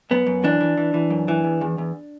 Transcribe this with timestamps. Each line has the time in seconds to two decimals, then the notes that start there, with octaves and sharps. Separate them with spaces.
0.11 F#2 B3
0.26 F#2
0.44 E3 D4
0.61 E3
0.78 E3
0.94 E3
1.10 F#2
1.28 E3
1.44 E2
1.61 E2
1.78 E2